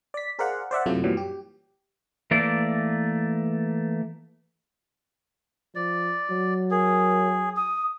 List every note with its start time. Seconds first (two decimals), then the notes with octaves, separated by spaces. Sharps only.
0.14 D5 B6
0.39 G#4 A#4 C5 D5 F5 F#5
0.71 C5 D5 E5 F#5
0.86 F#2 C3 F#3 A3 E4 F4
1.04 F#2 A#2 E3 F#3 G3
1.17 G4
2.31 E3 A3 A#3 D5
5.75 F3 D5
6.31 F#3
6.71 G#4 A#4
7.56 D#6